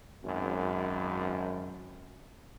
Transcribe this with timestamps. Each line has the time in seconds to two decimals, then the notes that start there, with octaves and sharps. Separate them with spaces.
0.24 G#1 F#2